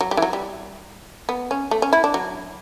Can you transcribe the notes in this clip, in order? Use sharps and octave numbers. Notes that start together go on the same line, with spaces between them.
F#3
G3
E3
F#3
G3
B3
C#4
A3
C#4
E4
D4
F#3